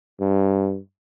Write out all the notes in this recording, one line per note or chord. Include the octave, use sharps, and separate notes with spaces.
G2